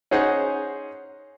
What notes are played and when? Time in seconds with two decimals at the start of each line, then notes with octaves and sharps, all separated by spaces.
0.11 C#4 D#4 G#4 C5 F#5